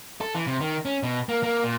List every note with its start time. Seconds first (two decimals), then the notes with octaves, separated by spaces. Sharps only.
0.21 A4
0.35 E3
0.47 C3
0.61 D#3
0.85 C#4
1.03 B2
1.29 A#3
1.43 A#3
1.64 A#2